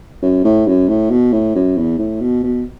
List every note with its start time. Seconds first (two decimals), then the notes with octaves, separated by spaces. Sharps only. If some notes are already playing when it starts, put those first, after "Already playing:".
0.22 F#2
0.44 A2
0.67 F#2
0.88 A2
1.11 B2
1.33 A2
1.55 F#2
1.77 E2
1.99 A2
2.21 B2
2.43 B2